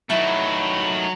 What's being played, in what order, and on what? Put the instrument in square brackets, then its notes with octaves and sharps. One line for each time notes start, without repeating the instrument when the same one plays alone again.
[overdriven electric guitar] D#3 A3 [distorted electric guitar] F#3 [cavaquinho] E4 B4